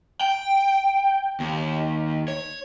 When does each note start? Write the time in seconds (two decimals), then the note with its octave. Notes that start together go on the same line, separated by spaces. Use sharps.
0.21 G5
1.40 D#2
2.28 C#5